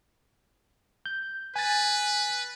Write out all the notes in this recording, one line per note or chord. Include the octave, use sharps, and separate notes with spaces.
G6
B4 G#5 A6